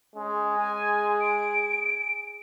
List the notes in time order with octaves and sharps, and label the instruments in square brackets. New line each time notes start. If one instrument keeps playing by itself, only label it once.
[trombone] G#3 [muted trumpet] C#4
[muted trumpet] G#4 [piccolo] G#5
[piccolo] D7